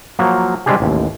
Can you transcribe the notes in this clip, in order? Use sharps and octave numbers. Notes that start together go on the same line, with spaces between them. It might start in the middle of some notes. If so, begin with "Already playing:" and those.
F3 F#3 A#3
G3 G#3 C4 D4 G4 G#4
A1 D#2